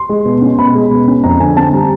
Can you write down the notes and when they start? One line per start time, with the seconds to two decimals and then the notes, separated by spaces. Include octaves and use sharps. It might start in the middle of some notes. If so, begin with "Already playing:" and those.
Already playing: C6
0.09 G#3
0.25 B2
0.42 C#4
0.58 B2 B5
0.75 G#3
0.91 B2
1.08 C#4
1.24 F2 A#5
1.40 D3 G#5
1.57 C4 A5
1.73 G3 A#5